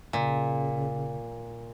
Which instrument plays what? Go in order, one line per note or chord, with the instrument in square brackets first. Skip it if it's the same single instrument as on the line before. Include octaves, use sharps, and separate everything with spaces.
[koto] A#2 [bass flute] C#3